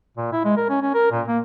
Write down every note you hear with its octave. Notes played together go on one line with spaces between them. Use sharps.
A#2
E4
G#3
A#4
C#4
C#4
A#4
A#2
A#3